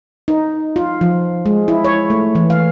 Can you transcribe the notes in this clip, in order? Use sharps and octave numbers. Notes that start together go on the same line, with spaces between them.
D#4
F4
F3
G#3
E4
C#5
A3
E3
F5